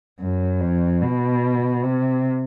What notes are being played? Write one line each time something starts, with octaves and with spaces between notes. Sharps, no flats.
F#2
F2
B2
C3